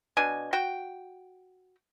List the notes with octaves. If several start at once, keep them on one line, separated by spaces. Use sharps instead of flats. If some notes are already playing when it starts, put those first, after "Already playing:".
B2 D4 G#5
F#4 G5